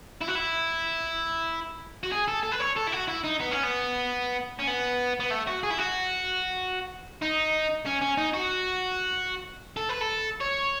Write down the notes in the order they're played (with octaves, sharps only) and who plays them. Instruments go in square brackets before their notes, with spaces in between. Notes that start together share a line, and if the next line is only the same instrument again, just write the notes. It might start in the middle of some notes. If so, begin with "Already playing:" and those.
[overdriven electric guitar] E4
F#4
E4
F#4
G#4
A4
A4
B4
C#5
A4
E4
F#4
E4
D#4
B3
C#4
B3
C#4
B3
B3
A3
F#4
G#4
E4
F#4
D#4
C#4
C#4
D#4
F#4
A4
B4
A4
C#5